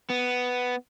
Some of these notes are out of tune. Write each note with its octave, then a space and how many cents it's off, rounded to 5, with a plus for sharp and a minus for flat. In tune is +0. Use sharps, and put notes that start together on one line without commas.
B3 +5